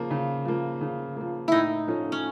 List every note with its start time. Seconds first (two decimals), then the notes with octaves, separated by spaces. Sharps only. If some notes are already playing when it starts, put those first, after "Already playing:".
Already playing: C#3 F3 A#3
0.10 C#3
0.45 F3 A#3
0.81 C#3
1.16 F3 A#3
1.48 A2 D#4 E4
1.87 F3 A3 C#4
2.12 C#4